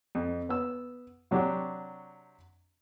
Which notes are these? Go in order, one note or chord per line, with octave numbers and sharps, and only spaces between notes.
F2
B3 E6
C3 F#3 D4 F#4 G4